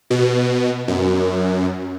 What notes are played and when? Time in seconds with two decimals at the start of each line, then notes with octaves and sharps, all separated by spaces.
0.10 B2
0.88 F#2